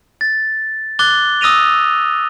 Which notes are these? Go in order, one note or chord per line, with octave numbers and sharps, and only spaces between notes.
A6
D6 F#6 A6 G7
D#6 E6 A#6 D#7 F7